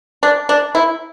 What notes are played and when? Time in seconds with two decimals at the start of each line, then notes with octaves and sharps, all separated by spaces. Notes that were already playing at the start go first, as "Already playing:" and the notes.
0.23 D4
0.49 D4
0.75 E4